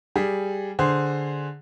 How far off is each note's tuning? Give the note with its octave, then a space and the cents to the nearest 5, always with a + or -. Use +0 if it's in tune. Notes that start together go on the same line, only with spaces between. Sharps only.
G3 +0 G#4 +0
D3 +0 G#4 +0 C5 +0